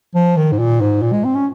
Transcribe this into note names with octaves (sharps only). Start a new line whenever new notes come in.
F3
D#3
G#2
A#2
G#2
A#2
G#3
C4
C#4